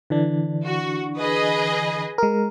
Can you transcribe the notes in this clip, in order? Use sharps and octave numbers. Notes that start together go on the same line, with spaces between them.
D3 E3 D4
F#4
G#4 B4 D#5
G#3 A#4